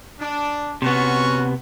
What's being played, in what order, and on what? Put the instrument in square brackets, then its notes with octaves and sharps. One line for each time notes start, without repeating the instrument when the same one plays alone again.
[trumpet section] D4
[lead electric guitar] C3 B3 [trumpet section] C#4 F#4 C#6